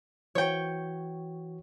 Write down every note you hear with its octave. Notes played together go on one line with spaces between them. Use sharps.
E3 F#4 C#5 G5